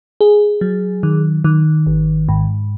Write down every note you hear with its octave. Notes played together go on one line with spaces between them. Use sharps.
G#4
F#3
D#3
D#3
G#1
G#2